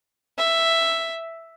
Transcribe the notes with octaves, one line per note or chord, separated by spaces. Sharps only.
E5